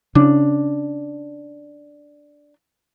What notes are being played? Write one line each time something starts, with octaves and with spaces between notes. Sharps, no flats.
C#3 D4